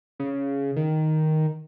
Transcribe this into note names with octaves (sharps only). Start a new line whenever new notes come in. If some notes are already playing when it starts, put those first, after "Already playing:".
C#3
D#3